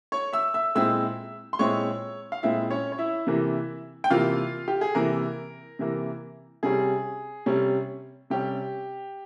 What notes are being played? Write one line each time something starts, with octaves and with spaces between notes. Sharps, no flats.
C#5 C#6
E5 E6
E5 E6
A#2 G#3 C4 E4 E5 E6
C6
A#2 G#3 C4 E4 C#5 C#6
F5
A#2 G#3 C4 E4 E5
C#4 C#5
C#5
E4 E5
C3 E3 A#3
G5
C3 E3 A#3 F4 F5
G4
G#4
C3 E3 A#3 A#4
C3 E3 A#3
C3 G3 C#4 G#4
C3 G3 C#4
C3 G3 C#4 G4